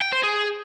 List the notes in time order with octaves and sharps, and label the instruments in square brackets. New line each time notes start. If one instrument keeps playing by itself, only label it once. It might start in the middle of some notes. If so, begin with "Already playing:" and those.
[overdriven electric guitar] G5
C5
G#4